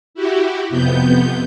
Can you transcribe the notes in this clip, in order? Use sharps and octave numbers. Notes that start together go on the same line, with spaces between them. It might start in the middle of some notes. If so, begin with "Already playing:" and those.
E4 F#4 G4
F2 C3 B3 G6